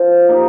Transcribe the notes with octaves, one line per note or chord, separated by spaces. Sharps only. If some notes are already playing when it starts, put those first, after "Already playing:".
Already playing: F3 C4
A#3 D#4 G4